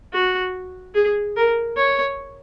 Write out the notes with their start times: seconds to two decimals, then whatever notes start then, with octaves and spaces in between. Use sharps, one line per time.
0.13 F#4
0.95 G#4
1.36 A#4
1.76 C#5